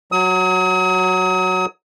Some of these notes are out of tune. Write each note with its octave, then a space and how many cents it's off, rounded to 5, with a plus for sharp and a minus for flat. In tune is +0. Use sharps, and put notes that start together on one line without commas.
F#3 +0 D#6 +40